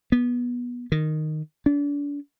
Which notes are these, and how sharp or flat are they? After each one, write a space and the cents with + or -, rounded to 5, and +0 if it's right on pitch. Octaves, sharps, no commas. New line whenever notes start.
B3 -20
D#3 -10
D4 -35